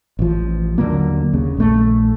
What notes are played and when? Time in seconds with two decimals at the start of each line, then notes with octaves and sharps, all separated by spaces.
0.19 A1 F3
0.78 D#2 D3 F#3 A#3
1.33 D#2 C#3
1.57 A#1 A3